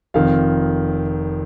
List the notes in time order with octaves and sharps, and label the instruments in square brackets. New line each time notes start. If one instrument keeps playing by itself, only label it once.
[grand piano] F1 F2 D#3 F5